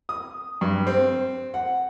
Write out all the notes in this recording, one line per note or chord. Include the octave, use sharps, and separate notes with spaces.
D#6
G2
C4
F#5